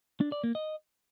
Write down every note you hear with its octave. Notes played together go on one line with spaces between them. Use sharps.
D4
D5
A#3
D#5